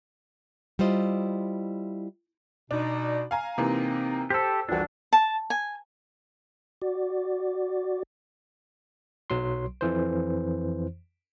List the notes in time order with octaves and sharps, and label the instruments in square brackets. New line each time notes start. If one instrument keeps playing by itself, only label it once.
[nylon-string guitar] G3 E4 F4 C5 D#5
[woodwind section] B2 D#4 [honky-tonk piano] D4
[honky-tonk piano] F5 G#5 A#5
[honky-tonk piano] C3 E3 A#3 [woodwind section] C4 D#4
[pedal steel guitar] G4 A4 [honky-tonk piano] C5 A5 E6
[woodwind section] C2 F2 E3 [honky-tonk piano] F3 F#4 [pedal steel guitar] D4
[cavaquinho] A5
G#5
[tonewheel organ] F#4 D5
[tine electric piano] B1 F#3 C6
F2 E3 C5